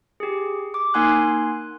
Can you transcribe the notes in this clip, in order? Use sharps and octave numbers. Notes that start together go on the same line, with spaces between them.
G4 G#4
D6
A#3 D#4 F#5 G#5 C6 F#6